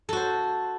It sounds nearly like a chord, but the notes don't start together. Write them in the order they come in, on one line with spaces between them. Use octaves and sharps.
A4 F#4 C5